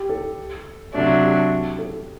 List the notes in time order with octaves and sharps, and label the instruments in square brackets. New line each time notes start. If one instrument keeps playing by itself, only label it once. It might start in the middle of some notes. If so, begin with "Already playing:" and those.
Already playing: [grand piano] G4
A4
[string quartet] C3 F#3 A3 D4
[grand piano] G4
A4